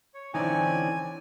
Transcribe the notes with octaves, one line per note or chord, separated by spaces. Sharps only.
C#5
D3 E3 C4 C#4 D#4 D5 G#5